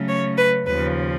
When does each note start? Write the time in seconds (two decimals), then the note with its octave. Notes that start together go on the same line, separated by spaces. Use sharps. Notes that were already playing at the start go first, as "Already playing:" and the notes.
Already playing: C#3 F#3 A3 C#4
0.08 C#5
0.38 B4
0.66 D#2 C#3 F3 B4